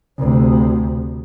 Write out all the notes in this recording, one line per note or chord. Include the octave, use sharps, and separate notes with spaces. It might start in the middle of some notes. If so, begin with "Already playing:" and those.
D2 C3